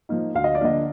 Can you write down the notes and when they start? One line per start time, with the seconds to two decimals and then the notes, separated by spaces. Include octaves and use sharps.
0.09 F3 A#3 D#4
0.35 D2 F5
0.44 D#5
0.55 D5
0.61 D3 F3 A#3 D4 D#5